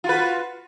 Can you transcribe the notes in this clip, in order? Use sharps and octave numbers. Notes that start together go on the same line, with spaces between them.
F4 F#4 B4